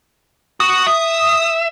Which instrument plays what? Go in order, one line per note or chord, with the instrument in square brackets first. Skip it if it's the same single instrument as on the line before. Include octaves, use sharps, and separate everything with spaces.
[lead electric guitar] F#4 [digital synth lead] D#6
[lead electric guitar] E5